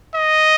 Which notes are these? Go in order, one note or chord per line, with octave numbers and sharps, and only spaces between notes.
D#5